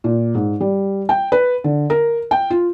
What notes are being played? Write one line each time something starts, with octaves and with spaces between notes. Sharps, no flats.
A#2
G#2
G3
G5
B4
D3
A#4
G5
F4